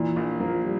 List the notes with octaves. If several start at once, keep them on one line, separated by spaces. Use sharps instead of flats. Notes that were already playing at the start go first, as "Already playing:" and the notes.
Already playing: A#2 E3
A#1
F3 A#3
G3